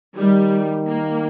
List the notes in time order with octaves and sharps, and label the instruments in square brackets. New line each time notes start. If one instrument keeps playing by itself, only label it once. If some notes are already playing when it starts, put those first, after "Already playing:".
[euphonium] D#3 [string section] G3
[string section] A#3